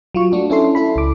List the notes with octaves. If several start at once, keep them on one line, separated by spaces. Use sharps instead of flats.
F#3 F4 C#6
A3 D4 F#4
C#4 E4 A4 C6
E4 A4 B5
C#2 D6